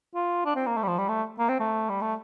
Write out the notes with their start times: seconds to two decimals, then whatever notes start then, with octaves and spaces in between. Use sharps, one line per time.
0.15 F4
0.46 D4
0.56 C4
0.66 A#3
0.77 A3
0.83 G3
0.88 F3
0.98 G3
1.09 A3
1.39 A#3
1.49 C4
1.60 A3
1.89 G3
2.02 A3